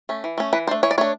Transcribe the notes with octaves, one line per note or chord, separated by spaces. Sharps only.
A3 C#4
E3
A3 C#4
E3 B4
A3 D4 C5
E3 C#5
D5
A3 D4 C#5